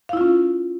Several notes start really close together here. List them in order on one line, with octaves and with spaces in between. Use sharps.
F5 E4 F4 C#4